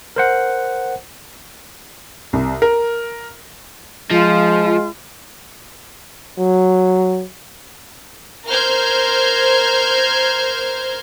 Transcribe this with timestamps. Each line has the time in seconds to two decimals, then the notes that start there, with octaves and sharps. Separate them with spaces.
0.16 A#4 C5 F#5
2.33 C2
2.62 A#4
4.11 F3 G#3 F4
6.38 F#3
8.47 A#4 C5 F6 G6 G#6